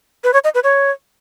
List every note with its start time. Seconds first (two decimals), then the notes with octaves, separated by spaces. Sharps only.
0.24 B4
0.33 C#5
0.44 D#5
0.55 B4
0.64 C#5